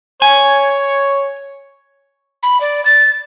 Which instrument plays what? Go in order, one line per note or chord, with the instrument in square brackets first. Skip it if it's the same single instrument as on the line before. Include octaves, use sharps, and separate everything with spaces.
[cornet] C#5 [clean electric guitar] G#5
[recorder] B5
D5
A6